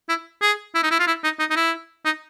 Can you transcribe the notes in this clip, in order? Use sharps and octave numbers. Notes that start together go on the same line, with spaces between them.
E4
G#4
E4
D#4
E4
F4
E4
D#4
D#4
D#4
E4
D#4